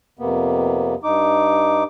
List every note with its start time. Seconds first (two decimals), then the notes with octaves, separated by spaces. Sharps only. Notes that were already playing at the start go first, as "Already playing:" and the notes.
0.19 F2 C3 A#3 B3
1.04 G2 D#4 D6